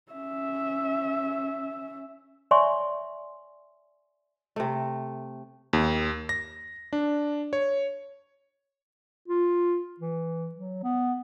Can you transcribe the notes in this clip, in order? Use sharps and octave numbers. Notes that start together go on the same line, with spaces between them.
C#4 E5
C#5 D5 E5 G#5 C6 C#6
C3 A3
D#2
A#6
D4
C#5
F4
E3
F#3
B3